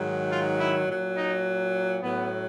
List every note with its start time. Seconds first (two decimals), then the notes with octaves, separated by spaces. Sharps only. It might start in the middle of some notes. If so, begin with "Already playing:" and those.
Already playing: G#2 D#3 F#3
0.31 F4
0.59 E4
0.87 A#2 F#3
1.16 D#4
2.02 A2 F#3 B3